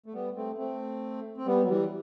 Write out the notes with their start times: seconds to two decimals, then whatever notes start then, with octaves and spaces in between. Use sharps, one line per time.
0.06 A3
0.14 G3 B3
0.35 A3 C4
0.58 A3 C4
1.37 C4
1.46 G3 B3
1.63 F#3
1.69 E3 G3